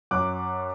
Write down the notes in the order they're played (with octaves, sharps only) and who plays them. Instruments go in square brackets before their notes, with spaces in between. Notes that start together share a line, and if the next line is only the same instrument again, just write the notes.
[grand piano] F#2 D6 F#6